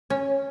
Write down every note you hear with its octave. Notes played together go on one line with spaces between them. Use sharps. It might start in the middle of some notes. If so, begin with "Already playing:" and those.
C#4